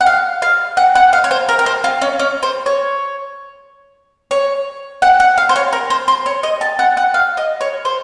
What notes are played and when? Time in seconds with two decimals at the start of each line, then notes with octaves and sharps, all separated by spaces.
0.01 F#5
0.06 F5
0.42 F5
0.77 F#5
0.95 F#5
1.13 F5
1.24 C#5
1.31 C5
1.49 A#4
1.59 A#4
1.66 C5
1.84 F4
2.02 C#4
2.19 C#4
2.43 C5
2.66 C#5
4.31 C#5
5.02 F#5
5.20 F#5
5.38 F5
5.49 C5
5.56 C#5
5.73 A#4
5.90 C5
6.08 C5
6.26 C#5
6.43 D#5
6.61 A5
6.79 F#5
6.97 F#5
7.14 F5
7.37 D#5
7.61 C#5
7.85 C5